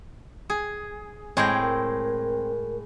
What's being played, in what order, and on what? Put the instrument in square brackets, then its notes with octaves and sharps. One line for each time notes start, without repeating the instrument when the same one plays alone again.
[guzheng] G#4
[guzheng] A2 G#3 G5 [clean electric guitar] C4
[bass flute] A#4